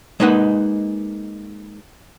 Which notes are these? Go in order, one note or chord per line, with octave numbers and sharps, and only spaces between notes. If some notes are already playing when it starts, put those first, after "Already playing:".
G#3 A#3 D#4 B4 F#5